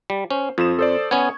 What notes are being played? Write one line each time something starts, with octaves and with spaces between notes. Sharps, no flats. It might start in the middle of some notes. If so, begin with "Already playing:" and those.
G3
C#4 C5
F2 F3 D#6 E7
A4 C5 D5
B3 C#4 C#6 G#6